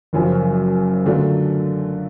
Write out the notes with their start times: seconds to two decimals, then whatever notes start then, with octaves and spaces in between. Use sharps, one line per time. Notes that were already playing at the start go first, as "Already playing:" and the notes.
0.13 F#1 F#2 C#3 F3
1.05 D3 F#3 A3 D4 F4